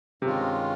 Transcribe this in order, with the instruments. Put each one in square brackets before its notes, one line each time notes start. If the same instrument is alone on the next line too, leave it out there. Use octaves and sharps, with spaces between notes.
[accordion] G2 D#3 G#3 C#4 F4 [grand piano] C3